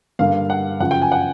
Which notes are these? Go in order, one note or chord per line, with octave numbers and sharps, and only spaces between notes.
G2 D3 G3 A#3 F5
F#5
F#2 C#3 F3 F#5
G5
G#5
F#5